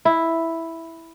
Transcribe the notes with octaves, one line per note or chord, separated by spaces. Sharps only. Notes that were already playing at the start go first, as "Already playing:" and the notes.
E4